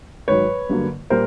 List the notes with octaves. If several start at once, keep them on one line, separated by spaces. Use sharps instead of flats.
G#2 D#3 F#3 B4 C#5
G2 D3 F#3 A#3
A#2 G3 A#3 A#4 C5